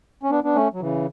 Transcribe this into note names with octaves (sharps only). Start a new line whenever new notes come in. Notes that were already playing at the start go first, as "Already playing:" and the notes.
C#4
B3 D4
B3 D4
A3 C#4
F#3
C#3 E3